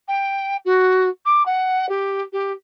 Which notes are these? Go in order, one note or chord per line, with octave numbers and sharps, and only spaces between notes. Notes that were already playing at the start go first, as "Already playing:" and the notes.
G5
F#4
D6
F#5
G4
G4